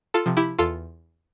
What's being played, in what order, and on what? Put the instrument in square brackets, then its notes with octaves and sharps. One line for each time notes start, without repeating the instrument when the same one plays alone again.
[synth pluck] F4 A4
C3 F3
E4 G4
E2 F4 A4